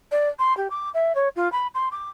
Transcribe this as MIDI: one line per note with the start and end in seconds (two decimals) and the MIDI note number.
0.11 0.28 74
0.39 0.56 84
0.57 0.68 67
0.70 0.90 86
0.94 1.15 76
1.15 1.28 73
1.36 1.51 65
1.52 1.67 83
1.74 1.89 84
1.92 2.10 86